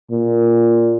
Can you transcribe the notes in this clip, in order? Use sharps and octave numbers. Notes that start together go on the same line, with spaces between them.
A#2